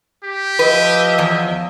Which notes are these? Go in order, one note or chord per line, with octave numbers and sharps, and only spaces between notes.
G4
F3 B4 D#5 E5
E2